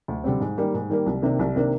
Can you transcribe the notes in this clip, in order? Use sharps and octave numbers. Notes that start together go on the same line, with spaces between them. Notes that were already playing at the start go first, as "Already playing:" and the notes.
D2
D3 G3 C4
G#2
D#3 G3 A#3
G#2
D#3 G3 A#3
C2
C3 D#3 A#3 D4
C2
C3 D#3 A#3 D4